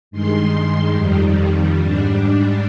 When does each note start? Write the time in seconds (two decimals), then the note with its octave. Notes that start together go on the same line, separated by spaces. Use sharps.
0.11 G2 D#3 G#3 C6
0.95 F2 D#3 G3
1.77 G#2 G3 D4